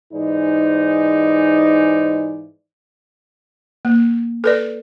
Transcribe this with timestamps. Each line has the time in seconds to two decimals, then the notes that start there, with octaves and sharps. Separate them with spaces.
0.13 G#2 E3 D#4 C5 D5
3.85 A#3
4.44 A4 B4 D5